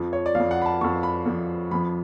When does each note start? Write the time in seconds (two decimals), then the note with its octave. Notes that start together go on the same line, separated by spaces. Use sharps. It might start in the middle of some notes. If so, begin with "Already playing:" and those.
Already playing: F2 F3
0.13 C#5
0.26 D5
0.35 F2 F3 F5
0.51 F#5
0.62 B5
0.66 A5
0.81 F2 F3 C#6
1.03 B5
1.26 F2 F3
1.71 F2 F3 B5